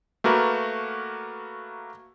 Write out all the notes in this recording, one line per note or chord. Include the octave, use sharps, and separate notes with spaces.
A3 A#3 F#4 A#4 B4